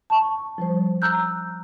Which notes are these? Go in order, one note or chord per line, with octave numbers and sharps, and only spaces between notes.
A5 C#6
F3 G3 C5
A#5 E6 F#6 G6